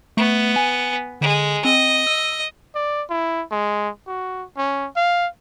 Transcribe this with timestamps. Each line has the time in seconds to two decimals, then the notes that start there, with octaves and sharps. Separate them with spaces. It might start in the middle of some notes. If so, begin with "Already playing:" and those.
0.17 A3 B3
0.56 G#5
1.21 D3 G#3
1.65 C4 D#5
2.07 E6
2.75 D5
3.10 E4
3.51 G#3
4.07 F#4
4.57 C#4
4.97 F5